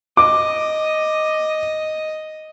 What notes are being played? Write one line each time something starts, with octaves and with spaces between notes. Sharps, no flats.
D#5 D6